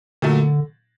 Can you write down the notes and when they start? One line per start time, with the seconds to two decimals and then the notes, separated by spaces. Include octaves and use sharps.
0.22 A#2 D3 F#3 A3